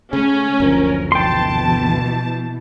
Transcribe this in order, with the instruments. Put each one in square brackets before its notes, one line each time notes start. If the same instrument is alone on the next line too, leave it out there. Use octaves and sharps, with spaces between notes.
[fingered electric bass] C#3 [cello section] A3 [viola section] C#4
[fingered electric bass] F#1 D2 F3 [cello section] A#4
[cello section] B2 E3 [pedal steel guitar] G5 C6 [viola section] A5